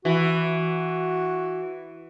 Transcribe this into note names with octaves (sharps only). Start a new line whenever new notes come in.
E3 F#4